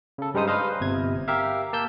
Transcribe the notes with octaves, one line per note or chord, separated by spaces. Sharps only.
C#3 A4
G2 G3 G#3 D#4 C5 D#6
B4 C5 D#5 F5
G1 C3 G#6
G4 A#4 E5 F5
A#3 A5 E6 G6